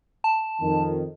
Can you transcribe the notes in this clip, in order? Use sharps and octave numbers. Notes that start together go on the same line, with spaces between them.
A5
F2 D#3